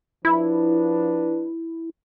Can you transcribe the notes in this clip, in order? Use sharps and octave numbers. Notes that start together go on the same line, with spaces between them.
F3 D4 E4 B4